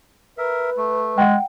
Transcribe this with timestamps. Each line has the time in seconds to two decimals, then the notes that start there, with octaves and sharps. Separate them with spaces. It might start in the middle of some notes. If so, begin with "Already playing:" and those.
0.38 A#4 B4 E5
0.77 A3
1.18 G#3 F#5 G5